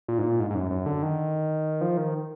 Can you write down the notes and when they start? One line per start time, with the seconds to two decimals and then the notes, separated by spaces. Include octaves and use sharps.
0.08 A#2
0.18 G#2
0.23 A#2
0.40 G#2
0.50 G#2
0.55 F#2
0.71 F#2
0.86 D3
1.02 D#3
1.81 F3
1.97 D#3